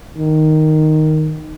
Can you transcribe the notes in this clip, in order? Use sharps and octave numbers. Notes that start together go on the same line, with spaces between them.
D#3